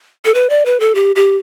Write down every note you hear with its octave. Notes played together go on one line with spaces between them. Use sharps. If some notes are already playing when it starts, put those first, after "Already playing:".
A4
B4
D5
B4
A4
G4
G4